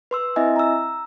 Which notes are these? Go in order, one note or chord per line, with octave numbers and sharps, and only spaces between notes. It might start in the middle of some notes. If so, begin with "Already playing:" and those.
B4 C6 E6
C4 E4 D#5 E5 G#5
A#5 E6